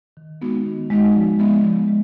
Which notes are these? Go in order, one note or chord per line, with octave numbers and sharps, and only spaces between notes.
D#3
G#3 B3 D#4 F#4
D#3
G#3 B3 D#4 F#4
F3
G#3 B3
F3
G#3